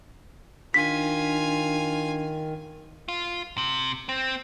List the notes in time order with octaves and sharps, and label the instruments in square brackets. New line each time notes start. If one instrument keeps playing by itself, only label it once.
[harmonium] D#3 [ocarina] D4 [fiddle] F4 G#5 [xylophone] B6
[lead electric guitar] F4
C3
C4